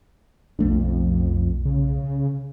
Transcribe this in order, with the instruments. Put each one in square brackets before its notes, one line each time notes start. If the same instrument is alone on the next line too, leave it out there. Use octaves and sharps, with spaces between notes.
[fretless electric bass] B1 A3 D4 [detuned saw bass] F2
[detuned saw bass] F2
C#3